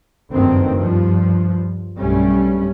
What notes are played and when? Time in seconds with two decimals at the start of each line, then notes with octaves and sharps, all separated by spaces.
0.32 F#1 D2 G2 D#3 B3 C4
0.75 G2 F3
1.99 B1 G2 G3 A3 C#4